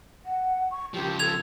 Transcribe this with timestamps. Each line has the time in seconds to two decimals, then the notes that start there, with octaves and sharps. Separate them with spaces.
0.25 F#5
0.70 C#6
0.94 C#3 F3 G4
1.19 A4 G#6 F7